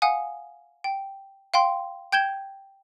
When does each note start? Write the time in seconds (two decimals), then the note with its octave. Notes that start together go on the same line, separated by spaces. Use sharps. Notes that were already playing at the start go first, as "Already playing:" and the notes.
0.02 F5 F#5 G#5 D#6
0.84 G5
1.54 F5 G5 C6
2.12 G5 G6 G#6 E7 G7